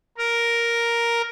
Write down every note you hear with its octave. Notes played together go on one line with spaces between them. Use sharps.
A#4